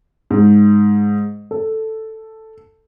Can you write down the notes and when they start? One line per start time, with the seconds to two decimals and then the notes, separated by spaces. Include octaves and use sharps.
0.30 G#2
1.51 A4